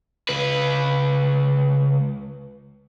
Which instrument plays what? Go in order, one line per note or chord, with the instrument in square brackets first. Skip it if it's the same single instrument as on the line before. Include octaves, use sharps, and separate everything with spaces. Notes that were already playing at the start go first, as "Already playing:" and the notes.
[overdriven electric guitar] C#2 B4